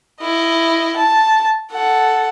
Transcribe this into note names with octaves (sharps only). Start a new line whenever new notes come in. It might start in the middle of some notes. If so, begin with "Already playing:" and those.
E4 D#5
A5
A4 F#5